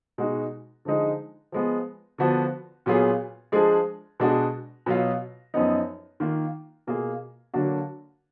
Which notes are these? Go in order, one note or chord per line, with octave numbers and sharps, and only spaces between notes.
B2 G#3 D#4 F#4
D3 F3 G#3 D#4
F3 G#3 B3
D3 F3 B3 D4 F#4
A#2 F#3 B3 F4 G#4
F3 G#3 D4 G#4
B2 G#3 D4 F#4
B2 F#3 B3 F4
F#2 F3 B3 D#4
D#3 A#3 F4
B2 A#3 F4 G#4
D3 F#3 A#3 D4 F#4